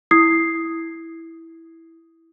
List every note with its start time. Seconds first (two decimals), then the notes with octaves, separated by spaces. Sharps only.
0.11 E4 D#6 G#6 C7